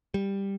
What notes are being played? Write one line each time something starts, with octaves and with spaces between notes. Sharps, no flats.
G3